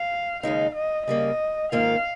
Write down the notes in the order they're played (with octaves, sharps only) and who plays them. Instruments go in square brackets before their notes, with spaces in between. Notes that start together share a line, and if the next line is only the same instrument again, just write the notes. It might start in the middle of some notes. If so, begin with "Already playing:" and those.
Already playing: [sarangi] F5
[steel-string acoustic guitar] D#2 C#3 G#3 D#4 [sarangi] F5
[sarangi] D#5
[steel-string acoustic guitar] C#3 G3 A#3 [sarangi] D#5
[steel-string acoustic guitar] G#2 D#3 A#3 F4 [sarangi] F5